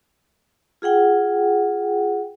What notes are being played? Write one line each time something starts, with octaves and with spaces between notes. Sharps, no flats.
F4 G#4 F#5 G5